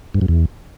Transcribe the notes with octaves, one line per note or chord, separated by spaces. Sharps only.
G2
F#2
E2